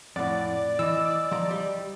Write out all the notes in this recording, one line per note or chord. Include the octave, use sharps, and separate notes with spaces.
F2 A2 D5 F#5 D6 A6
E3 D#5 E6
F3 A#5
G3